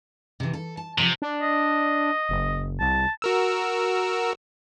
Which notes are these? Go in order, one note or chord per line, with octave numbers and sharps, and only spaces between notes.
C3 E3
A4
A5
E2 C3 F3
D4
D#5
F#1
C2 A5
F#4 A#4 E6